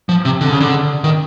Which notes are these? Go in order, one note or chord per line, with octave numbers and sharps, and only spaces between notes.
F3
C3
D3
C#3
D3
D#3